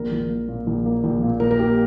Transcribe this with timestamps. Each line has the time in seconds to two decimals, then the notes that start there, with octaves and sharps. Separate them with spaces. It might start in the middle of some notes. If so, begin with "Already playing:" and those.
Already playing: A#1 A#4
0.12 A#1
0.30 A#3
0.49 A#2
0.67 A#1
0.86 A#3
1.04 A#1
1.23 A#2
1.40 A#3 A#4
1.51 A#4
1.59 A#3 G4